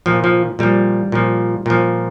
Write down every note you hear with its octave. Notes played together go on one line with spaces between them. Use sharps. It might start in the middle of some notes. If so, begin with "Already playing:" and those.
A#2 F3
F3
A#2 F3 G3
A#2 F3
A#2 F3